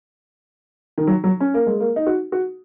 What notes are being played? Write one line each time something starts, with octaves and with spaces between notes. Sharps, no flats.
D#3
F#3
F#3
C#4
A#3
G#3
A#3
D#4
F#4
F#4